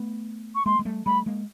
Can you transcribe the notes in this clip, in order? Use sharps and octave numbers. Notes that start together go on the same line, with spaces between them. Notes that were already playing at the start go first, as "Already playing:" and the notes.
Already playing: A3 B3
C#6
G#3 A#3 C6
G#3
G3 A3
G3 A3 B5
G#3 A#3